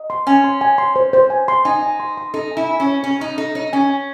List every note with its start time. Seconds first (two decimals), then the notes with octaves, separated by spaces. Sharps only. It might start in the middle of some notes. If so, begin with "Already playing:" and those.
Already playing: D#5
0.10 C6
0.27 C#4 G#5
0.44 C6
0.61 G#5
0.78 C6
0.96 C5
1.13 C5
1.30 G#5
1.48 C6
1.65 D#4 G#5
1.83 G#5
2.00 C6
2.17 C6
2.34 D#4 A4
2.51 G#5
2.57 E4
2.69 G#5
2.80 C#4
2.86 C#5
3.03 C#4 C#5
3.20 D#4 C#6
3.38 D#4 A4
3.55 D#4 C#5
3.73 C#4 G#5
3.90 G#5